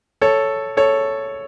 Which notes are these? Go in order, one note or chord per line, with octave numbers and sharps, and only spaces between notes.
A4 C#5
A4 C#5